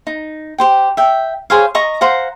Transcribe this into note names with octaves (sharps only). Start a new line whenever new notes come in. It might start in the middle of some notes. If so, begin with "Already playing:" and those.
D#4
G4 C5 G5
E5 G5
G#4 C5 C#5 F5
D#5 A#5 C#6 D#6
C5 F5 F#5 A#5